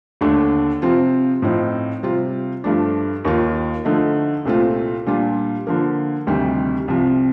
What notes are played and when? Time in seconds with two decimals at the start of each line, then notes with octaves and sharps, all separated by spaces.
0.21 D#2 D3 A3 D4
0.82 C3 F3 C4 F4
1.42 A2 F3 C4 D#4
2.03 C3 G3 C4 F4
2.64 G2 F3 A3 D4
3.25 D#2 D#3 A#3 F4
3.85 D3 F3 A3 D#4
4.45 C2 A#2 A3 C4 F4
5.07 A#2 G3 D4 F4
5.67 D3 F3 A#3
6.27 D2 C3 D#3 G3
6.88 C2 C3 F3